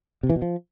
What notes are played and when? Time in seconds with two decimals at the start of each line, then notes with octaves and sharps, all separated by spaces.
0.23 C3
0.30 E3
0.36 B2
0.42 F3